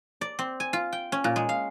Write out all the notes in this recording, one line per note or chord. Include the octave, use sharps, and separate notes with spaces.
D5
C4
G#5
F4
G5
C#4
A#2
G#3
F5